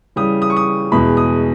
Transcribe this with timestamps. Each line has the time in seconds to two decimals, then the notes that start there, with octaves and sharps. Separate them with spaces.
0.16 C#3 E3 G3 D#6
0.42 D#6
0.50 C#6
0.56 D#6
0.92 E2 B2 G#3 B5
1.17 D#6